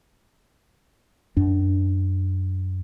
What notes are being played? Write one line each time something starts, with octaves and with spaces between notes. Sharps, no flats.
F#2 D4